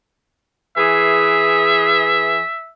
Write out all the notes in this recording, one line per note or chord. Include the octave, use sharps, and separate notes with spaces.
E3 G#4 E5